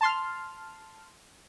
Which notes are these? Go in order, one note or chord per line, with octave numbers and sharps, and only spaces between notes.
A5 C6 F6